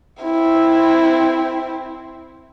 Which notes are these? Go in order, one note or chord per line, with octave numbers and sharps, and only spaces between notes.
C4 E4